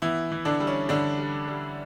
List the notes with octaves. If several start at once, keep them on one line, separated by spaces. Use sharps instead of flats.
E3 B3 E4
E3
D3 D4
G3
C#4
D3 G3 D4
G3
G3